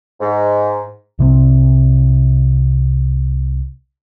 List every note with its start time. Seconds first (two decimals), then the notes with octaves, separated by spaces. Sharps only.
0.21 G#2
1.19 C2 C3 F#3 C4